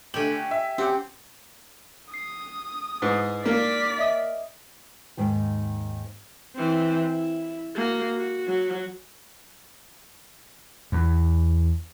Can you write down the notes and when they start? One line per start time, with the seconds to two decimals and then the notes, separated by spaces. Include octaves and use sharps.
0.14 D3 A3 G4 G#5 F#7
0.51 E5
0.78 C4 C#4 G4 F#5
2.14 D#6 C7
3.02 G#2 E4 G#4 B4
3.46 A#3 D#4 D5 B6
3.98 D#5 E5 D#6
5.17 D#2 G#2 D#3 G5
6.56 E3 C4
7.11 E4
7.76 A#3 F#4
8.17 F#4
8.47 F#3
10.92 E2